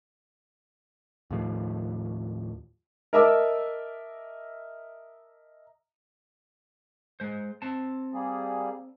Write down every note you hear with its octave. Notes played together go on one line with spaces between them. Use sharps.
D#2 A2 F3
A#4 D#5 E5 A5 D6 E6
G#3 C5
C4 A5
G3 A#3 G#4